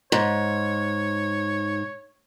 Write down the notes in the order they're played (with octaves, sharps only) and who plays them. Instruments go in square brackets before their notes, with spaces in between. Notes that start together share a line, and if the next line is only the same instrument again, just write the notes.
[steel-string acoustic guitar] G#2 [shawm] C#5